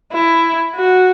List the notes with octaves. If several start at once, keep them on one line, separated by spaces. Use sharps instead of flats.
E4
F#4